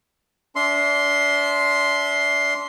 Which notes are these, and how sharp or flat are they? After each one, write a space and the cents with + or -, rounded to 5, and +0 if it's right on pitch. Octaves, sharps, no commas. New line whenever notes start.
D4 -35 E5 -15 C6 +5